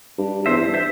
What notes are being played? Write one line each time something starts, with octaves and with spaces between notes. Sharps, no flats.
G2
G2
E2 C5 E5
E2
G2
C5 E5